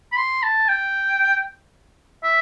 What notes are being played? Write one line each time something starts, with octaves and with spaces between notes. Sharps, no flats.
B5
C6
A5
G5
E5